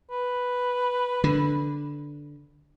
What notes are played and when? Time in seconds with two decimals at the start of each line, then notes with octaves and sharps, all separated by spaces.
0.11 B4
1.24 D3